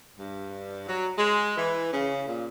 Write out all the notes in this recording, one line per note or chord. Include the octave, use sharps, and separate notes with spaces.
G2
F#3
G#3
E3
C#3
A#2